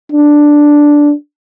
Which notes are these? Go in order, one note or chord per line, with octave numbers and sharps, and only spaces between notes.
D4